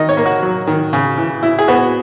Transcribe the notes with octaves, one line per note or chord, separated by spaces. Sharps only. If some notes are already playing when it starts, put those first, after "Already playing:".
Already playing: D#3 D#5
C#5
A#3
F#4
F#3
D#3
C#3
E3
E4
G#4
B3 F#4